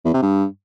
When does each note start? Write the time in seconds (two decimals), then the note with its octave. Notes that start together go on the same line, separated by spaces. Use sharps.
0.05 E2
0.14 C3
0.22 G2